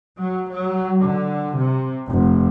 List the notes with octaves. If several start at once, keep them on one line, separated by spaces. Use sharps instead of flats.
F#3
F#3
D3
C3
F1